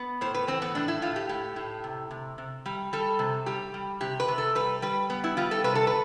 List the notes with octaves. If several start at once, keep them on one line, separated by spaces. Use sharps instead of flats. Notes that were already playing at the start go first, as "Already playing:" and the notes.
Already playing: B3
A2 C5
B4
E3 C4
B3
A2 D4
E4
A2 F4
G4
A2 G4
A2
C3
C3
C3
G3
G3 A4
C3
G3 G4
G3
C3 G4
B4
C3
A4
G3 B4
G3 B4
B3
E4
G3 F4
A4
C3 B4
A4
B4